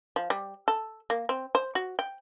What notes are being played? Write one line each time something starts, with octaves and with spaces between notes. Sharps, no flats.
F3
G3
A4
A#3
C4
C5
F#4
G5